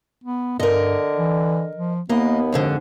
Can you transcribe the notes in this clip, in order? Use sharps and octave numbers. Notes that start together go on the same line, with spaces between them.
B3
G2 D3 A#4 D#5
E3
F3
D#2 A#3 B3 D#5
F2 G#2 D3